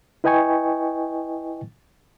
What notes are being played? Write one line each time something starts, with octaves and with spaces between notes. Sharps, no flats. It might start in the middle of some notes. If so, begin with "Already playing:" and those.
E4 B4 D#5 G5 G#5 C#6